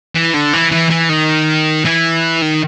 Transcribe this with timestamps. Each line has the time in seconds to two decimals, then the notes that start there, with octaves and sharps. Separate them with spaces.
0.15 E3
0.34 D3
0.53 E3
0.72 E3
0.90 E3
1.10 D#3
1.85 E3
2.42 D#3